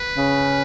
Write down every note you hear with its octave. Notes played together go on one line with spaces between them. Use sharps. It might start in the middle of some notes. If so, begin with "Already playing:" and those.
Already playing: B4
C#3